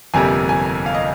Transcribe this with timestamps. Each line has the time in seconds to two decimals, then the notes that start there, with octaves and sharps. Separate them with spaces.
0.14 G1 F2 C3 G3 A#3 G#5
0.49 G#5
0.86 F5
0.94 D#5